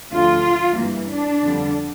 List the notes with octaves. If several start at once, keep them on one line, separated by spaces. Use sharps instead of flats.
D2 D3 F3 F4
G2 E3 A#3
D4
F2 D3 G3